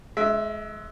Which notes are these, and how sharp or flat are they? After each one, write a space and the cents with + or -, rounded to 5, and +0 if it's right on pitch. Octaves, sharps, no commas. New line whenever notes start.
G#3 +30 E5 +0